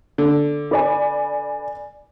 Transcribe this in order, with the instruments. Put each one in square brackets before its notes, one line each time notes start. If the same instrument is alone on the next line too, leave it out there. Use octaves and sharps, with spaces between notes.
[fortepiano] D3
[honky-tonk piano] B4 D5 G#5